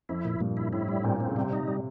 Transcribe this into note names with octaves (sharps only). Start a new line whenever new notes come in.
F2 E4
A#2
G2 A#2
E4
A2 E4
G3
A#2 C4
C4
C#3
C3 G3
D#4
G3